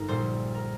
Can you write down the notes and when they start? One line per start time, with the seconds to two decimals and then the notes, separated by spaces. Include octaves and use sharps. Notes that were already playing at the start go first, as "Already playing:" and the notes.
Already playing: G1 G2 D#4 A#4
0.08 A#1 A#2 G3 C5
0.55 A#4